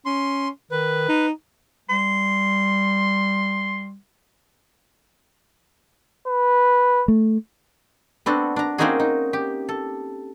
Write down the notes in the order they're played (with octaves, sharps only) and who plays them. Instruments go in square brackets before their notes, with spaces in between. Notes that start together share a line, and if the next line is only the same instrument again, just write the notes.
[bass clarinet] C#4 [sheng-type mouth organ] C6
[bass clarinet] D#3 [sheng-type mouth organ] B4
[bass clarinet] D#4
[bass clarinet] G3 [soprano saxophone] C6
[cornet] B4
[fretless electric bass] A3
[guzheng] B3 C4 D4 F#4 A4
D4 A#5
A#3 C4 C#4 D#4 F#4 G#4
D#4
G4
A4